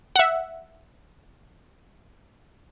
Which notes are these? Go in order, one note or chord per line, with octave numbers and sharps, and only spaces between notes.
E5 F#5